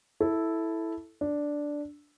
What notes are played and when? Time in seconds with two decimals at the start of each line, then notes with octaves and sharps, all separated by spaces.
0.20 E4 A4
1.21 D4